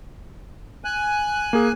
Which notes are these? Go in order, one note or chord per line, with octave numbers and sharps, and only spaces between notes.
G#5 F#6
A#3 G#4